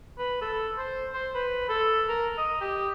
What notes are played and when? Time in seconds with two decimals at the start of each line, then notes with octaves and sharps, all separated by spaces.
0.18 B4
0.42 A4
0.78 C5
1.13 C5
1.35 B4
1.69 A4
2.08 A#4
2.38 D#5
2.61 G4